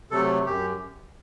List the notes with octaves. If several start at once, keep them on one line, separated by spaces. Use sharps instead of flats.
C3 F#3 A3 A4
F#2 G4